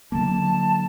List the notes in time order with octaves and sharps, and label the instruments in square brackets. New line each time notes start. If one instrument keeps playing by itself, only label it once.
[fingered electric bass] D3 F#3 A#3 [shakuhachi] A5